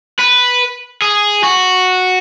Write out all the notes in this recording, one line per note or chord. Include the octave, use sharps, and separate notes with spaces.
B4
G#4
F#4